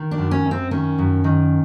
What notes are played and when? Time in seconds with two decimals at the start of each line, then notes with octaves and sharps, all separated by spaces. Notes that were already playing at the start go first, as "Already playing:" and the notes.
Already playing: D#3
0.11 D4
0.18 F#2
0.31 C#4
0.45 F#2
0.51 C4
0.71 D#3 C#4
0.98 F#2
1.24 D#3